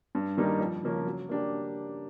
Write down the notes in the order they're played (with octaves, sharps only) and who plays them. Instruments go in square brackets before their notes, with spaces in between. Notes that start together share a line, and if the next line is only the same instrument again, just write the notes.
[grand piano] G2
D#3 G3 A#3 D#4
F2
C#3 F3 A#3 C#4
F#3
A#3 D4 G4